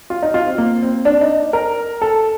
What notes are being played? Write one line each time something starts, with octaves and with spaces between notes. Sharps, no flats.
F4
D#4
F4
C4
A#3
C4
D4
D#4
A#4
A4